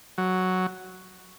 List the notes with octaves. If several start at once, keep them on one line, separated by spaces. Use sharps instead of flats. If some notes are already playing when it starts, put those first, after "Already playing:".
F#3